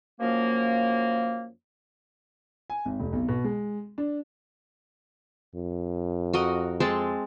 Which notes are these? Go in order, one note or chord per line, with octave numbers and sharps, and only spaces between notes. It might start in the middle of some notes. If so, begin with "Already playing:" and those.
F#2 F3 A#3
G#5
G#1
F1
B1
B2
G#3
D4
F2
F#4 A#4 D#5
G#3 C4 A5